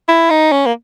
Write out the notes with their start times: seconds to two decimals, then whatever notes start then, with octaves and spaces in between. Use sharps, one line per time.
0.08 E4
0.30 D#4
0.52 C#4
0.66 A#3